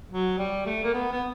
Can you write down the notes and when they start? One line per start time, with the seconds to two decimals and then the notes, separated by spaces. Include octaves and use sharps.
0.10 F#3
0.38 G3
0.66 A3
0.83 A#3
0.93 B3
1.12 B3